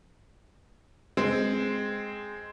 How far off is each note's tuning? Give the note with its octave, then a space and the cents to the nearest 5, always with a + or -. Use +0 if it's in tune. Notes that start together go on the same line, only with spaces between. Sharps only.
G#3 +0 C4 +0